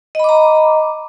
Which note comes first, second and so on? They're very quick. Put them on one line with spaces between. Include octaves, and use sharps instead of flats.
D#5 B5 D6 A#5